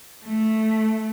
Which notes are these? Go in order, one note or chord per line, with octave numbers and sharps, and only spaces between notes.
A3